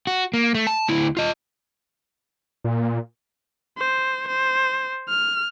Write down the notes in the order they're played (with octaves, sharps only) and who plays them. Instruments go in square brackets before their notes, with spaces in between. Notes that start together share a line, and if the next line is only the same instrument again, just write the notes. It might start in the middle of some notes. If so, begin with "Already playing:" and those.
[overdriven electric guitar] F#4
A#3
A3
A5
D2 E4
F4 D#5
[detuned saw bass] A#2
[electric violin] C5
C5
F6